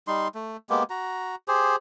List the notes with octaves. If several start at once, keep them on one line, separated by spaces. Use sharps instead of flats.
G3 D#4 C6
A3
G#3 A#3 B3 G4
F#4 A#5
G4 G#4 C5